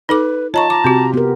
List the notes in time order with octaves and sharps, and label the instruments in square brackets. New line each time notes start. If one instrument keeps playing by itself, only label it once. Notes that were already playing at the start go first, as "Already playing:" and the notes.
[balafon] D#4 A4 D6 [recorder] B4
[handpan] F4 [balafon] C#5 A#5 C#6 [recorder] D#5 [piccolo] A5
[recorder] A#5 [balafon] D6
[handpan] C3 G4 [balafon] C4 F#4
[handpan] B3 A#4 [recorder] G4